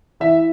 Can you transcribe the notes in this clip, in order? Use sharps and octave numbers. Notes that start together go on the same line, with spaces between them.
E3 E5